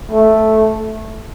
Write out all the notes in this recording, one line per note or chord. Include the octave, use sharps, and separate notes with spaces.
A3